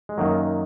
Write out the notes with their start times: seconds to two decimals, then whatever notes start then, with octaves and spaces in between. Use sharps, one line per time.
0.09 G#3
0.18 F#2 D#3 F#3 A#3